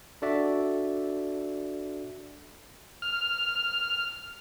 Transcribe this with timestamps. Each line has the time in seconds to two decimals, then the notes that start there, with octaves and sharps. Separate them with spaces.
0.22 D4 F#4 A4 D5 E5
3.02 F6